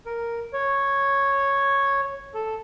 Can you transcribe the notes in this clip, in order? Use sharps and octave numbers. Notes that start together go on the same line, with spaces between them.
A#4
C#5
A4